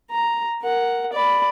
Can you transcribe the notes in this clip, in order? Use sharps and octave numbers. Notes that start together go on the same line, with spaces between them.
A#5
A#4 F#5
D5 B5